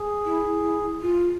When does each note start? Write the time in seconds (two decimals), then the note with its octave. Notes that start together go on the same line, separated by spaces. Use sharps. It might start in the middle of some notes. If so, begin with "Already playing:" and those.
Already playing: G#4
0.26 E4
0.63 E4
1.02 F4